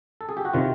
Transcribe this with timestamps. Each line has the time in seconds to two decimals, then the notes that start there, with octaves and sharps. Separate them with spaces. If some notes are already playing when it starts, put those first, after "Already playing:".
0.21 A4
0.29 G#4
0.37 G4
0.45 F#4
0.53 C3 D#3 F4